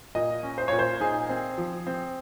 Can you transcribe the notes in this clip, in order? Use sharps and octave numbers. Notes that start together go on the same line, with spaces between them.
A#2 D#5
C#4
C5
A#2 C#5
C5
D#4 G#4
C4
F3
C4